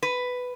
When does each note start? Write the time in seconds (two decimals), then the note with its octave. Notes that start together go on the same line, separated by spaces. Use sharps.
0.03 B4